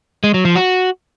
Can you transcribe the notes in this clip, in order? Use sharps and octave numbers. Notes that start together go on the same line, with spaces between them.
G#3
F#3
F3
F#4